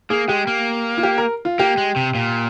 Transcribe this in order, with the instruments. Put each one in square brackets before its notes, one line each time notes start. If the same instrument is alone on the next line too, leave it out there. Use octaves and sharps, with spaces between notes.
[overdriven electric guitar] A#3 [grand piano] G#4
[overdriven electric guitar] G#3 [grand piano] G4
[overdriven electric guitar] A#3
[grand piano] F4
G4
A#4
F4
[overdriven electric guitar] A#3 [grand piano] G4
[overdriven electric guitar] G#3
C3
A#2